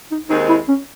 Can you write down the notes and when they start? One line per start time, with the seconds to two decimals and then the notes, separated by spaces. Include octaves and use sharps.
0.11 D#4
0.30 D#2 D#3 G#3 C4 D#4
0.49 E4
0.68 C#4